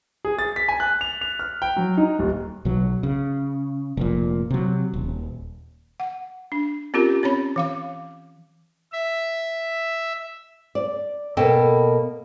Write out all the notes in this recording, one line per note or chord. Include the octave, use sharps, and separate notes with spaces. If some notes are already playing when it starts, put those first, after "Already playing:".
G#4
A6
B6
G#5
F#6
F7
F7
F6
G5
F#3
D#4
D#1
B1 F#3
C#3
F1 A#2
C3 F#3
D#1
F#5
D4
C4 C#4 F4 G4 A#4
C4 C#4 C#5 B5
E3 F5 D6
E5
D5
B2 A#3 B3 A4 G5 A5